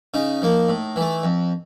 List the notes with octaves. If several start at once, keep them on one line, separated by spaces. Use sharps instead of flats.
C#3 D#4
F3 A#3
A2
E3 A3
F2